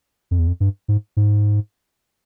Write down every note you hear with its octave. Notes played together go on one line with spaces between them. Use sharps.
F2
E2
F2
G2
G#2
G#2